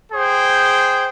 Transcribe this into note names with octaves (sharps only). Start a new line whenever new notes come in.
G#4 C5 G5